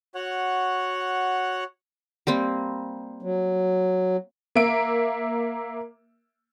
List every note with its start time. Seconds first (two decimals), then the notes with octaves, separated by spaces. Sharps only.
0.15 F#4 C#5 F#5
2.27 G3 A#3 C4
3.22 F#3
4.55 A#3 E5 D7